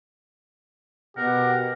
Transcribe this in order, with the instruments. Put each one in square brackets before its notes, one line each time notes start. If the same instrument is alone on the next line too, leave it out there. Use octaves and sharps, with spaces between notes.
[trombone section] B2 [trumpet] G4 [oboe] A#4 [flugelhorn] F#5